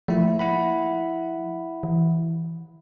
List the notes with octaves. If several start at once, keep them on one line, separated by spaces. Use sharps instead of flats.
F3 A3 A#3 E4
E4 F#5 B5
E3